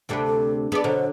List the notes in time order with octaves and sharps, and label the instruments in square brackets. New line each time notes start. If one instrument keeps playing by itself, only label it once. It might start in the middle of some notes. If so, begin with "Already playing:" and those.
[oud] D2 C3 A3 [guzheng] C4 D4 B4
[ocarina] A4
[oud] B3 D5 [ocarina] G#4 [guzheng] A4
[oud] B2 A#4 [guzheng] D3 F#3 A5 [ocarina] C5